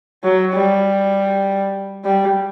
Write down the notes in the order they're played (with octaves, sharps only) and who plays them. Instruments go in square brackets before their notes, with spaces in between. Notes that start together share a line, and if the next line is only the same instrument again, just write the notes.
[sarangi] F#3
G3
G3